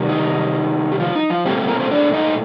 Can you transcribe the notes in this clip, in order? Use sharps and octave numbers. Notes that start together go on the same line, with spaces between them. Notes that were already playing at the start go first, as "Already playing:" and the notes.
Already playing: C3 D#3 G3
D#4
G4
F3 F4
D#4
F3 F4
A#2 G3 A3 C4 G4
G3 G4
A#3 A#4
C4 C5
D4 D5
D#4 D#5